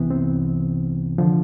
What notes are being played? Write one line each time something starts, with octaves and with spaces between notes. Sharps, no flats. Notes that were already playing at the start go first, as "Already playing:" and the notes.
Already playing: C2 C3 E3 B3
C4
D3 F3